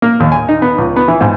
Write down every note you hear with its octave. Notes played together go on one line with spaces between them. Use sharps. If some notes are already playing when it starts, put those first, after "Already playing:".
A#3
D#2
G#5
D#4
B3
C#2
B3
E3
G#2